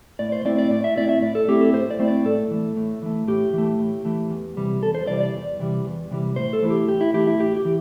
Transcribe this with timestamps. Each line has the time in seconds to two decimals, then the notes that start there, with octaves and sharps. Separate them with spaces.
0.19 A2 D5
0.32 C5
0.45 A3 C4 E4 D5
0.59 D5
0.70 A2 D5
0.84 E5
0.96 A3 C4 E4 D5
1.09 E5
1.22 A2 D5
1.35 A4
1.48 A3 C4 E4 G4
1.61 A4
1.73 A2 C5
1.90 D5
1.99 A3 C4 E4
2.08 D5
2.25 A2 A4
2.51 E3 A3
2.77 A2
3.02 E3 A3
3.28 A2 G4
3.53 E3 A3
3.79 A2
4.05 E3 A3
4.30 E2
4.57 C3 E3 G3
4.83 E2 A4
4.95 C5
5.07 C3 E3 G3 D5
5.21 D5
5.34 E2
5.60 C3 E3 G3
5.85 E2
6.11 C3 E3 G3
6.36 A2 C5
6.53 A4
6.63 E3 A3 E4
6.70 G4
6.88 A2 G4
7.01 E4
7.14 E3 A3 E4 G4
7.27 E4
7.39 A2 G4
7.56 G4
7.65 E3